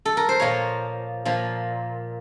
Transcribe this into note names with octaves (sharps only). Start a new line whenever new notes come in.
A4
A#4
C5
A#2 F3 A#3 C#5
A#2 F3 A#3